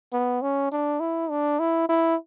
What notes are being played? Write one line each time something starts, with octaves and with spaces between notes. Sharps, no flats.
B3
C#4
D4
E4
D4
E4
E4